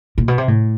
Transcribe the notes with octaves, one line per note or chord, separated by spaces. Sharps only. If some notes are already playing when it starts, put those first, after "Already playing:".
A#2
B2
C3
A2